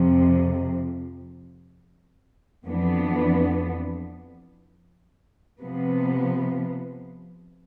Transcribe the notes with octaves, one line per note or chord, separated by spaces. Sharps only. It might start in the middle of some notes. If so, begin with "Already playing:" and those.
Already playing: F2 C3 F3
F2 E3 B3 D4
C3 F3 B3